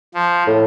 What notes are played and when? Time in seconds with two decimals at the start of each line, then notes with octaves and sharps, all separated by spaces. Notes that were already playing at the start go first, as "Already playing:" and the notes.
0.14 F3
0.47 A2